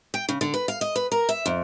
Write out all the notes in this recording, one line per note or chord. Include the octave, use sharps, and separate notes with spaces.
G5
C#3
D3
B4
F5
D#5
B4
A#4
E5
F2